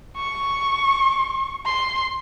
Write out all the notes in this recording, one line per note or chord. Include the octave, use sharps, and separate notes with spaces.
C#6
C6